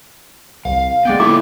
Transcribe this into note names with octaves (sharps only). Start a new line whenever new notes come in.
C2 F5
G#3 B3 D5 G5
A#3 E4 F4 A4 D6